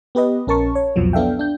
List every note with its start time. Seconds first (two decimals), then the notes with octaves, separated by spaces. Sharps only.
0.15 B3 G4 B4 D#5
0.47 A#1 C#4 A#4 A5 C#6
0.75 C#5
0.96 C2 F2 B2 F3 F#3
1.13 B3 D4 A4 E5 F5 G5
1.39 D4 G6